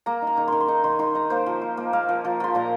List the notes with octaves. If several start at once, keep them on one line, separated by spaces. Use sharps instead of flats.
A#3 A#5
D#4
A#5
D#3
D#3 C6
C6
D#4 A#5
D#3 C6
D#3 C6
D#4 A#5
A#3 C5
F3
F4
A#3
A#3 F5
F3
F3
F3 C6
A#2 A#5